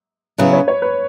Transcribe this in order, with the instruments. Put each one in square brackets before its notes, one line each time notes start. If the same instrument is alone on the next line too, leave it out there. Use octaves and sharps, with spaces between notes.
[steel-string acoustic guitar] C#3 F#3 B3 E4 [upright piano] B4
[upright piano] C#5
C#5
B4